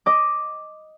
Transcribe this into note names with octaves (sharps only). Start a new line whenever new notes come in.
D#5 D6